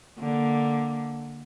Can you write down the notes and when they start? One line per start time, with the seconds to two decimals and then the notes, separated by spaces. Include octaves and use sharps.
0.19 D3 A#3